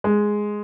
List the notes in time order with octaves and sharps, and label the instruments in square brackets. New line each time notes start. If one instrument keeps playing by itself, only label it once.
[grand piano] G#3